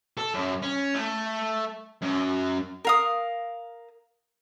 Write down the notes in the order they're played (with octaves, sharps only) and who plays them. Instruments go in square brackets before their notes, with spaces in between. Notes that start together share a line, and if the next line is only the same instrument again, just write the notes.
[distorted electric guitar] A4
F#2
C#4
A3
F#2
[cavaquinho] A#4 F5 D#6